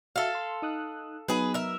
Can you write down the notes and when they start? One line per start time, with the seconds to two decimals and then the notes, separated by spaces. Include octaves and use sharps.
0.16 F#4 A4 E5 F5 A5
0.35 C6
0.62 D#4 D#6 F#6
1.28 F#3 B3 D#4 G#4 B4
1.54 A#4 E5